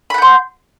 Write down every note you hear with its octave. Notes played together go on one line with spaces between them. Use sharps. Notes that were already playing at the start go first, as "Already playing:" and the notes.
F#5 B5 C6 G6